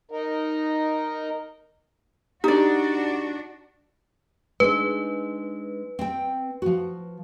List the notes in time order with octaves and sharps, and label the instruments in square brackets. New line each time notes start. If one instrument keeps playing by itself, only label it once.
[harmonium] D#4 A#4
[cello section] D4 F#4 [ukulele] D#4 D5 [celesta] G4
[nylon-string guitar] G#3 D4 D#4 [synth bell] B4
[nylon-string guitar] C4 G5
F3 F#4